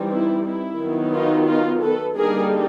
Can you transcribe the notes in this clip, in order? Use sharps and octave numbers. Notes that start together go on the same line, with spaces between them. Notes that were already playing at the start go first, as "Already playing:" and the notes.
Already playing: E3 G3 C4 D#4
E4
E4
D#3 F#3 B3
D#4 F4
D#4 F4
A4 B4
D3 G3 A#3 D#4 G#4 A#4